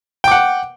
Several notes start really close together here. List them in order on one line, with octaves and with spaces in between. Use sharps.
G5 D6 F#5